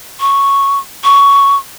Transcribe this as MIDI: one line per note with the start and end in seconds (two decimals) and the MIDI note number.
0.20 0.79 85
1.04 1.57 85